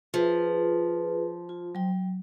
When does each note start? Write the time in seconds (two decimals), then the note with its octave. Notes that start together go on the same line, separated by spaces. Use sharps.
0.14 F3 F4 G#4 B4
1.49 F4
1.75 F#3 G5